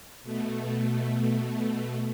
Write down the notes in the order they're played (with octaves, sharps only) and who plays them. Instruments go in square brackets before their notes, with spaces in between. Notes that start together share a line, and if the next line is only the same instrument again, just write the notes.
[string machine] B2 A3